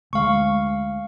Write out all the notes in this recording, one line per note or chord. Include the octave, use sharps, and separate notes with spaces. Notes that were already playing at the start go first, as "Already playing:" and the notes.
D2 G#3 F5 C#6